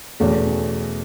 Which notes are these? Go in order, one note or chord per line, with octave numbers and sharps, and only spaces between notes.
E2 B2 A3 C#4